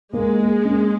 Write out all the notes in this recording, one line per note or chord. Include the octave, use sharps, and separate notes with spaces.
G#3 A#3
A#3
C#4